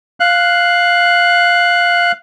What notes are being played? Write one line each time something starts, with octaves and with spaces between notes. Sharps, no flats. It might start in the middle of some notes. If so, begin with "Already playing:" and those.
F5 F#6